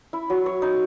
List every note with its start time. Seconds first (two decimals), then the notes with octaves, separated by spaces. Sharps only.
0.13 E4
0.30 F#3
0.46 C#5
0.62 D#4